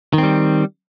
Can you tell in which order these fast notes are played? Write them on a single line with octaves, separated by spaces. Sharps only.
D#3 C4 G3